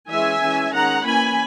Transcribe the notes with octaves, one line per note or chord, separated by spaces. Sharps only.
E3 G#3 C#4 E5 G#5
E3 G#3 C#4
D#3 G#3 C#4 F#5 A#5
E3 A#3 C#4 G#5 B5